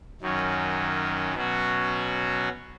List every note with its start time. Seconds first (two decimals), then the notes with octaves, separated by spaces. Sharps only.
0.21 F#2 D#3 F#3 C#4
1.35 B2 F#3 C#4 F#4